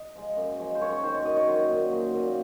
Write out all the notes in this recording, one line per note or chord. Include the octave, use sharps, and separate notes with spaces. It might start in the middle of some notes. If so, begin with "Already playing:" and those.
Already playing: D#5
F3 G#3
F#2
F3 G#3
C5
F#2 C#5
C#5
D#3 F#3 C5
C#5
F#2 D#5
C#5
D#3 F#3 C5
A#2
F#3
A#2